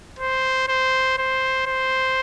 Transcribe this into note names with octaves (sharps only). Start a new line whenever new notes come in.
C5
C5
C5
C5